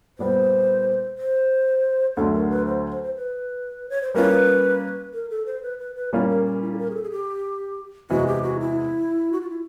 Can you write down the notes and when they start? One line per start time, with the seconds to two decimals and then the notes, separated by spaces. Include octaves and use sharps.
0.18 A#2 G3 B3 C5
1.18 C5
2.16 D2 D3 F#3 A3 A4
2.33 A#4
2.50 B4
2.66 C5
2.91 C5
3.03 C5
3.16 B4
3.89 C#5
4.02 C5
4.14 G3 A#3 C#4 F4 B4
5.14 A#4
5.30 A4
5.46 C5
5.63 B4
5.79 B4
5.95 B4
6.12 A#2 G3 A#3 C#4 F4 A#4
6.29 A#4
6.45 A#4
6.62 E4
6.73 A4
6.78 A#4
6.90 G#4
6.95 A4
7.03 G#4
7.11 G4
8.10 E2 C3 E3 G#3 F#4
8.27 G4
8.43 F#4
8.60 E4
9.33 F#4
9.41 F4
9.50 E4